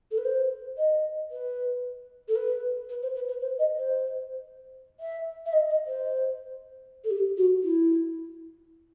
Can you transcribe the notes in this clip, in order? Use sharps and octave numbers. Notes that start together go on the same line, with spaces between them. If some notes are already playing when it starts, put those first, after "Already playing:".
A4
B4
C5
D#5
B4
A4
B4
B4
C5
B4
B4
C5
D#5
C5
E5
E5
D#5
D#5
C5
A4
G4
F#4
E4